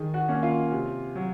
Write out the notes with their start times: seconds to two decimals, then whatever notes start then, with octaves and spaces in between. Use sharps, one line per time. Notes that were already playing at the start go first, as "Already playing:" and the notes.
Already playing: D#3 G#4 G#5
0.14 F#4 F#5
0.28 A#3 C#4
0.43 F4 F5
0.72 C3
1.15 F#3